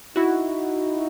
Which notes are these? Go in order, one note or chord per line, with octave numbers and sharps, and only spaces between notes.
D#4 E4 F#4